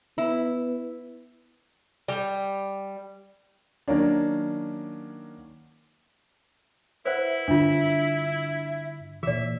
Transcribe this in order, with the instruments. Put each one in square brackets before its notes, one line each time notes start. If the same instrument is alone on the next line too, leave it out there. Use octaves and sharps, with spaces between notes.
[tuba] B3 [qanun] E4
[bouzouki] G3
[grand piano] D#3 F#3 A#3 C#4 D4
[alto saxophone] E4 [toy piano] B4 C5 F#5 [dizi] E5
[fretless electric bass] G2 D3 [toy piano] D4 F4 [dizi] E5
[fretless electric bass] A#2 E3 [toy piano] G#4 D5 [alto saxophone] E5